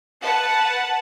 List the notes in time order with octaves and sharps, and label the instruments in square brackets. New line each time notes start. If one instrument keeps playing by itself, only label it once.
[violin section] B4 F#5 A5